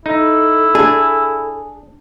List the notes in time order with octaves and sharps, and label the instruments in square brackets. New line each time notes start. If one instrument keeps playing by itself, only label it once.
[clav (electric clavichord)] D#4 [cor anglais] E4 [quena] A4
[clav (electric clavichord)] D4 [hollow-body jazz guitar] G#4